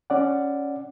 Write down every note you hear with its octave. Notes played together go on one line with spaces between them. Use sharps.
C#4 D5 F#5